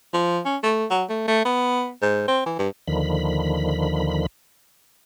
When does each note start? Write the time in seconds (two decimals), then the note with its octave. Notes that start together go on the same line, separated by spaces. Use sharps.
0.14 F3
0.45 C#4
0.63 A3
0.91 F#3
1.10 A3
1.28 A3
1.45 B3
2.02 G#2
2.28 C4
2.46 E3
2.59 G2
2.88 D#2 D3 D#3 F3 B5